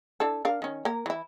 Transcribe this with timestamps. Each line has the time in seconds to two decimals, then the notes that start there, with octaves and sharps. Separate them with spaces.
0.20 D4 E4 A4
0.45 D4 A#4 F5
0.62 D#3 C#4
0.85 A#3 A#4
1.06 E3 E4